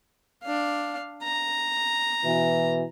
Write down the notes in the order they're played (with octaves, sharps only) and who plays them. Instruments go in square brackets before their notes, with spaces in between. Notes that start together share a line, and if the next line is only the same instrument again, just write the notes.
[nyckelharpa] D4 F5
A#5
[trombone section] B2 E3